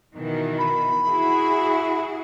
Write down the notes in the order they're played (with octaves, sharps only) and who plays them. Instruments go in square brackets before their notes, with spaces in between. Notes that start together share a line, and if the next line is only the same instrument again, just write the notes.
[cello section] B2 D#3 E3
[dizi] B5
[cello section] E4 F#4 G#4